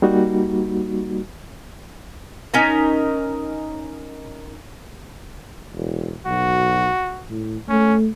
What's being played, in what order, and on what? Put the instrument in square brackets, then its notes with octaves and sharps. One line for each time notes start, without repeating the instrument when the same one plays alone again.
[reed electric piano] G3 A#3 D#4 F#4
[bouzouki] C#4 D#4 A#4
[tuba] E1
[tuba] B1 [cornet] F#4
[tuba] A2
[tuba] A3 [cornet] C#4